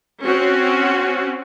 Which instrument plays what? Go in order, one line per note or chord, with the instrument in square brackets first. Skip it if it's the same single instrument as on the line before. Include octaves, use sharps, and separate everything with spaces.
[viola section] C4 C#4 F#4